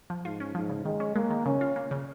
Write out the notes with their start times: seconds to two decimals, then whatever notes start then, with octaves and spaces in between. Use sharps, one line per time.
0.10 F3
0.25 G#2 F4
0.40 C#4
0.55 G#2 F3
0.69 C#3
0.85 D#3 G#3
1.00 C#4
1.15 G#3 A#3
1.30 D#3
1.46 C#3 C#4
1.61 F4
1.76 A#3
1.91 C#3